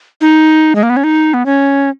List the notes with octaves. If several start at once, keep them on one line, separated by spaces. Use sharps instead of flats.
D#4
G#3
A#3
B3
C#4
D#4
B3
C#4